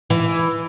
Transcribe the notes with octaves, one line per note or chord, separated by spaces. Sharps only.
E3